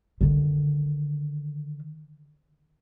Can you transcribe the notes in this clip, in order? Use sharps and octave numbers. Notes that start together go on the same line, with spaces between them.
D3 D#3